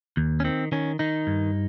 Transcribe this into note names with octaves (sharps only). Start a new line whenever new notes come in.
D#2
C#4
D#3 C4
D#3 C#4
D#3 D#4
G2